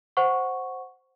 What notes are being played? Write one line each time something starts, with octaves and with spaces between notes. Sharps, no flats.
C5 F#5 C#6